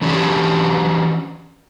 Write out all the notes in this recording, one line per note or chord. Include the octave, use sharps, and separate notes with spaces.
E3 C#4 D4 F#4 G4